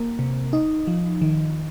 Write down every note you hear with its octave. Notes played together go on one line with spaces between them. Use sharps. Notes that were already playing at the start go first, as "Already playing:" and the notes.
Already playing: A#3
C3
D#4
F3
D#3